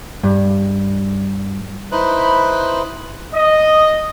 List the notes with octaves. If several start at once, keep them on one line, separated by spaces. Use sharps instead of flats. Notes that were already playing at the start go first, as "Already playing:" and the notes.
G2
D#4 E4 B4 C5 F#6
D#5